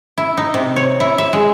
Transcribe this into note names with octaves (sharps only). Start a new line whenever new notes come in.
E4
D#4
C3
C#5
E4
E5
G#3